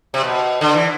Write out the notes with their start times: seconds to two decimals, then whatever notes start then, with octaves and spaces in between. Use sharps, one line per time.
0.14 C3
0.24 B2
0.61 D3
0.74 E3